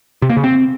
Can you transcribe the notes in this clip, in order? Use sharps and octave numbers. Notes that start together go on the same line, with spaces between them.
C3
A#3
C#3
C4